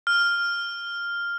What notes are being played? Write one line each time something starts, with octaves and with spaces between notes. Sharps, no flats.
F6